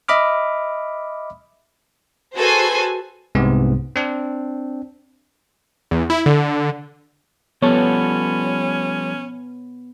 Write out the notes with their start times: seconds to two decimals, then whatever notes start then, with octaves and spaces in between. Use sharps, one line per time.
0.08 D#5 E5 B5 D6 F6
2.36 F#4 G#4 A4 B4 C5 G#5
3.35 C2 G#2 C3 B3
3.96 C4 D4
5.91 E2
6.10 E4
6.26 D3
7.62 F3 G3 B3 C#4 A4 C#5